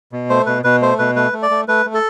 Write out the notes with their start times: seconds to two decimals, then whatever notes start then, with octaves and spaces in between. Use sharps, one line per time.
0.12 B2
0.30 A3 C5
0.46 B2 B4
0.64 B2 B4
0.82 A3 C5
0.99 B2 B4
1.16 A3 B4
1.33 A3
1.43 D5
1.51 A3
1.68 A3 B4
1.86 A3
1.94 A4